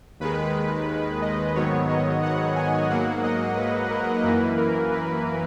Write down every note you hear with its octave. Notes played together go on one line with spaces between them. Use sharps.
D#2 D#3 G#3 B4
D#5
G#2 D#3 F#3 B3 C#5
D#5
F#5
G#5
G#2 F#3 A#3 F#5
D#5
B4
A#4
F#2 E3 A#3 B4
A#4
B4